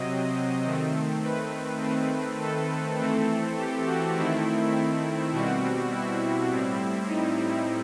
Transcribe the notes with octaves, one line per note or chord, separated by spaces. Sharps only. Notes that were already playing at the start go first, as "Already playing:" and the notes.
Already playing: C3 F#3 C4 D#5
D#3 A3 C4
B4
D#3 A3 C4
A4
E3 A3 C4
G4
F#4
D#3 A3 C4 E4
B2 G3 C4 F#4
E4
A2 G3 C4
D#4
E4